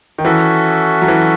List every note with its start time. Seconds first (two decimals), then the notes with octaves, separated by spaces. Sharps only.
0.18 D#3
0.24 E3 C#4 F#4 A4 E5
1.02 F#3
1.08 E3